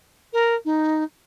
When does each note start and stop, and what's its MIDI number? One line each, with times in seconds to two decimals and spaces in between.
0.33 0.55 70
0.65 1.03 63